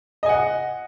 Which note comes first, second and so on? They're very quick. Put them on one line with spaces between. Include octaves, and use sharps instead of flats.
D#5 G#5 F#5